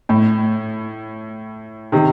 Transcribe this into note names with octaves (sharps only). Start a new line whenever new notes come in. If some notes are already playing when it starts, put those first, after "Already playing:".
A2
C3 D#3